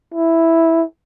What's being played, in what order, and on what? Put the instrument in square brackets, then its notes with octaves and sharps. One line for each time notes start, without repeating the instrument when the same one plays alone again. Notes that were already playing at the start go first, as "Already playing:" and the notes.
[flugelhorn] E4